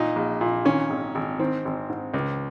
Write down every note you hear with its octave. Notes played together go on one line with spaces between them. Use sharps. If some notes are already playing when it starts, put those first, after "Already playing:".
Already playing: A#2 D#4
A#1
A#2
D#3 C#4
G#1
G#1
D#3 C4
G#1
G#2
C#2